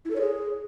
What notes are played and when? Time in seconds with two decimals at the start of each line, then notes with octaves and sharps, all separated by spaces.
0.05 E4
0.10 A4
0.16 C#5
0.21 G#4